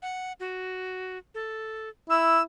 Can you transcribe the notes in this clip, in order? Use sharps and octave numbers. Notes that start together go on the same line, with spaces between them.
F#5
F#4
A4
E4 E6